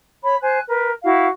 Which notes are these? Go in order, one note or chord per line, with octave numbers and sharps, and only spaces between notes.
C#5 B5
C5 G#5 F#6
A#4 B4
E4 F#4 F5